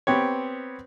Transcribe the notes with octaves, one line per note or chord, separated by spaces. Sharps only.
B3 C4 G4 C#5